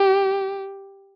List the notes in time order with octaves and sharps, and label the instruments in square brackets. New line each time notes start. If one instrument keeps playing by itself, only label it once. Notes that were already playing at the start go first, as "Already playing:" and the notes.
Already playing: [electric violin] G4